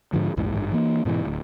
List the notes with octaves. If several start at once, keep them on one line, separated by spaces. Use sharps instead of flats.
G#2 D3 F3
A#1 E2 G#2 E3
G#1 G2
E3 A#3
G#2 B2 D3 E3
D1 D2